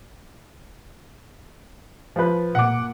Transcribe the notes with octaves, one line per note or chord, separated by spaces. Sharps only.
F3 B4
A#2 F#5 D6